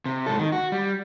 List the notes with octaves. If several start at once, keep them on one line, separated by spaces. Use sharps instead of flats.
C3
G#2 A4
D#3
F#4
G3